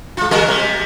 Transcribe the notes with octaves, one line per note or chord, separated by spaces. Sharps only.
G#3 F4
G3 F#4 A#4
C3